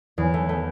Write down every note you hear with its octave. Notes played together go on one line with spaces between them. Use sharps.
E2
A3
A3